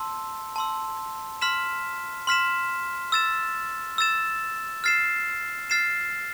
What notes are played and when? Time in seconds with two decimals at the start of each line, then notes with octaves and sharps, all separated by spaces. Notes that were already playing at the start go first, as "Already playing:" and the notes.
Already playing: A5 C6 E6
0.56 A5 C6 E6
1.41 C6 F6 B6 E7
2.27 C6 F6 B6 E7
3.12 E6 A6 E7
3.98 E6 A6 E7
4.84 F6 A6 C7 E7
5.70 F6 A6 C7 E7